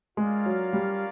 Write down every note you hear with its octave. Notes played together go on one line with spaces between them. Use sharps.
G#3 C#4 F4 A#4 D5 F5
F#3
G3